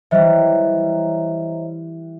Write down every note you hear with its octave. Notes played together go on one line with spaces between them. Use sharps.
E3 G3 C5 C#5 D#5 E5 A#5